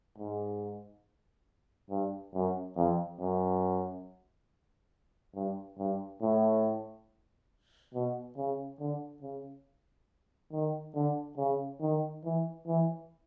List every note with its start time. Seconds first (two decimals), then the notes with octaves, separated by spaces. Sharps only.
0.18 G#2
1.90 G2
2.34 F#2
2.76 F2
3.21 F#2
5.35 G2
5.78 G2
6.22 A2
7.94 B2
8.37 C#3
8.80 D3
9.22 C#3
10.52 D#3
10.95 D3
11.37 C#3
11.82 D#3
12.25 E3
12.67 E3